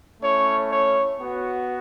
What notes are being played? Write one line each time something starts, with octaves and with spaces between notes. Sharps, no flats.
A3 C#4 E4 C#5
C#5
B3 F#4